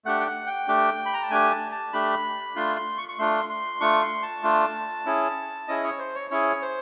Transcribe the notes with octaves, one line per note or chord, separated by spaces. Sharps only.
A3 D4 G4 F#5
G5
F#5
G5
A3 D4 G4
B5
A#5
A5
A3 D4 G4 G#5
A5
A5
A3 D4 G4 B5
A3 D4 F4 C6
C6
C#6
C#6
A3 D4 F4 C6
C6
A3 D4 F4 C#6
C6
A5
A3 D4 F4
C#4 E4 G#4
C#4 E4 G#4 D#5
C#5
C5
C#5
C#4 E4 G#4 C#5
C5